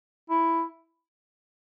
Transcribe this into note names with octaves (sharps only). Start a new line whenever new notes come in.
E4